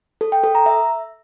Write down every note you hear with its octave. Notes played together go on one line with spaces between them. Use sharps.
A4
G5
A4
A#5
E5